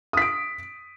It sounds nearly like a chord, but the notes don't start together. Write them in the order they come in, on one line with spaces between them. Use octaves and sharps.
D#6 B6 D7